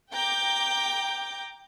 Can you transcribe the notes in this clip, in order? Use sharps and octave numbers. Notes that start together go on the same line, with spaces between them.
G5 A#5 D6 G6